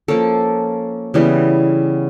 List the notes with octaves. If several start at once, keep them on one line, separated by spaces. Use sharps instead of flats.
F3 A#3 C#4 A4
C#3 E3 G3 B3